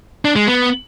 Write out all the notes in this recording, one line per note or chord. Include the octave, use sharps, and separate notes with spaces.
D4
G#3
B3